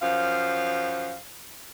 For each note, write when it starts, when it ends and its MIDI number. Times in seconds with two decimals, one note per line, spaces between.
0.02 1.15 42
0.02 1.15 53
0.02 1.15 77